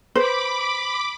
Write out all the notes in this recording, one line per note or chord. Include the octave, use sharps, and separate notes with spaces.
B4 C5 B5 D6